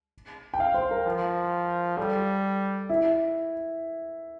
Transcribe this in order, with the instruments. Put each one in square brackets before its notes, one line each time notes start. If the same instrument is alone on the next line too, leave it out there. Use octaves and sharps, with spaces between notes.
[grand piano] G5
F5
C5
A#4
[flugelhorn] F3
[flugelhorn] G3 [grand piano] A4
[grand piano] E4